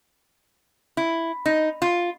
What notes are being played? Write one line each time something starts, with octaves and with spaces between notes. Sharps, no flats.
E4
D#4
F4